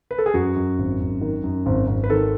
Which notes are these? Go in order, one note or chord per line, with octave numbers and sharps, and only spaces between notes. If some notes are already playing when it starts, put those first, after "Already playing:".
B4
A4
G#4
F#2 F#4
F#2
G#1
F#2
D#3
F#2
G#1
G#1
B4
D#3 A4